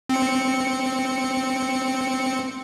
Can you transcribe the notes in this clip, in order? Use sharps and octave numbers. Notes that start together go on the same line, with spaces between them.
C4 C#7